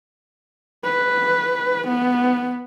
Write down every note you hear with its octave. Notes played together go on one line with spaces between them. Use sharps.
B4
B3